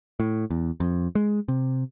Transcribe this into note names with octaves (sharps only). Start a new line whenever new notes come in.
A2
E2
F2
G#3
C3